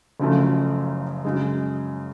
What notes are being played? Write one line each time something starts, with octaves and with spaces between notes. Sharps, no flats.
F#1 F#2 C#3 F3 A3
F#2 C#3 G#3